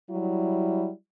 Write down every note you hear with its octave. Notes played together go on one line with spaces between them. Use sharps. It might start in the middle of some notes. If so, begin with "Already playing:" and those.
F#3 G3 E4